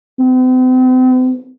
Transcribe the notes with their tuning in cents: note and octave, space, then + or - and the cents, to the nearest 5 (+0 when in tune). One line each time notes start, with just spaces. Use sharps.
C4 -45